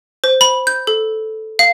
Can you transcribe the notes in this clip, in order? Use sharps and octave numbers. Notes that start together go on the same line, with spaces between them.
C5
B5
G6
A4
F5